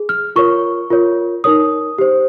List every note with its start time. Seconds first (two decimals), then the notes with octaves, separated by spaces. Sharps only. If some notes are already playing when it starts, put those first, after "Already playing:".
Already playing: G#4
0.09 F6
0.36 F4 A#4 C#5 C#6
0.90 F4 A#4 C#5
1.44 D#4 A#4 C#5 D#6
1.98 G4 C5